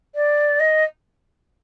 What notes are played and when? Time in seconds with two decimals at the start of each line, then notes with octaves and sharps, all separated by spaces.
0.15 D5
0.60 D#5